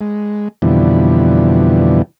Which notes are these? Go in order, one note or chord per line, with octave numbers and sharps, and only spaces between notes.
G#3
F2 B2 D3 E3 G3